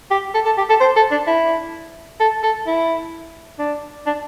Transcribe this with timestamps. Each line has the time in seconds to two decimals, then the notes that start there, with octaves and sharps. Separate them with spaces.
0.11 G4
0.34 A4
0.45 A4
0.57 G4
0.69 A4
0.80 C5
0.96 A4
1.11 D4
1.27 E4
2.20 A4
2.43 A4
2.67 E4
3.59 D4
4.06 D4